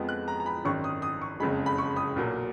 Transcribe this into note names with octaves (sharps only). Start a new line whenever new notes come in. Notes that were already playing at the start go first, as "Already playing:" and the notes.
Already playing: F2 F3 G#3 B3
F#6
A#5
A#5
B5
G#1 F#2 D#3 C#6
D#6
D#6
C#6
F#1 F2 C#3 G#3 B5
B5
C#6
D#6
B1 A#2 F#3 A#3